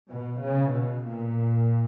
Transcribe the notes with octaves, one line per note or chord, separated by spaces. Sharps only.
B2
C#3
B2
A#2